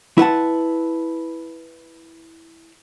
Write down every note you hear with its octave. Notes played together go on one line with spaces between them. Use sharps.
E4 B4 F#5 A5